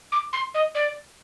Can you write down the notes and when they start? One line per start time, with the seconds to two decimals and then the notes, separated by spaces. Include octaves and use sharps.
0.12 D6
0.33 C6
0.54 D#5
0.75 D5